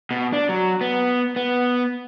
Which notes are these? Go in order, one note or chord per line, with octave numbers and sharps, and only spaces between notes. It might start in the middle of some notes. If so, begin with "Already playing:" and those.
B2
D4
F#3
B3
B3